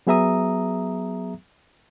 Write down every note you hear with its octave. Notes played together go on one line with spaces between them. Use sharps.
F#3 B3 G#4 E5 A#5 D#6